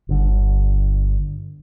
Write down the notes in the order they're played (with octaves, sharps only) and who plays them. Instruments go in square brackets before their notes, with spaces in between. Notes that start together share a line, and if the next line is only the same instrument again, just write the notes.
[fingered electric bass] G1 D3